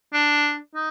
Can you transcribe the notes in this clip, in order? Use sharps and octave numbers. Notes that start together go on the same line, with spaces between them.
D4
D#4